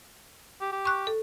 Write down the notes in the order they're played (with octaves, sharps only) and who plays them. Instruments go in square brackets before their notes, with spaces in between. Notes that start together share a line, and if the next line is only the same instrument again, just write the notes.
[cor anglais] G4
G4
[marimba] C#6 F#6
A4